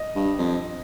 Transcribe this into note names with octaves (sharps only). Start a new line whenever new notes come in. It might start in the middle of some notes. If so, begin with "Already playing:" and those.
Already playing: D#5
G2
F2